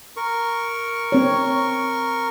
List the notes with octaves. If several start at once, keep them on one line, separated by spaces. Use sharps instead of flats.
A#4 C#6
C4 C#5